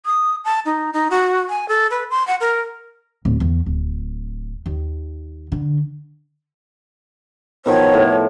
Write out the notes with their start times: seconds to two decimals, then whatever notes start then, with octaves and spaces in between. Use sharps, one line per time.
0.05 D#6
0.45 A5
0.66 D#4
0.93 D#4
1.10 F#4
1.50 G#5
1.69 A4
1.91 B4
2.10 C6
2.27 F#5
2.41 A#4
3.25 D1
3.40 E2
3.66 D1
4.66 D#2
5.52 D3
7.66 B2 D#3 F3 C#5
7.94 A2